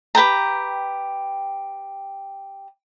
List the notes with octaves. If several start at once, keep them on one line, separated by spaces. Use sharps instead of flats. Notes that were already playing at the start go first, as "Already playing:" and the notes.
G4 B4 G5 A#5